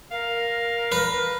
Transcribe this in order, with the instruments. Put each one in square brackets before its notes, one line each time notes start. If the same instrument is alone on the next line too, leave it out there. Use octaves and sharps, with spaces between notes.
[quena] A#4 [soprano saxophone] F5
[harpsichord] B4